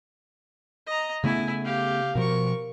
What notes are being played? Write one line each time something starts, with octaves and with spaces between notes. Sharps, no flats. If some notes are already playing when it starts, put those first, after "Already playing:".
D#5 A#5
C#3 A3 B3 E4 G#5
G4 F5
B2 F3 A#4 C#6